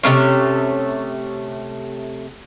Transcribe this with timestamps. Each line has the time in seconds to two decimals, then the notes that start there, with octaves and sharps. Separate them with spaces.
0.03 C3 A3 A#3 C#4